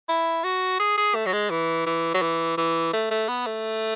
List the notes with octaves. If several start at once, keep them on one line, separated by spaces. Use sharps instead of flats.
E4
F#4
G#4
G#4
A3
F#3
G#3
E3
E3
F#3
E3
E3
A3
A3
B3
A3